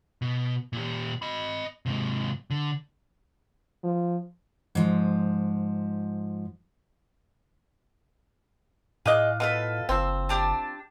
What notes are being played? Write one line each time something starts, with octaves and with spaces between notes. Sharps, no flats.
B2
A#2 G4
D#5 B5
G#2 C3
D3
F3
G#2 F3
A2 F4 G#4 D#5 D6 F#6
B2 F4 A4 B4
F#1 F3 C4 E6
D4 G4 A5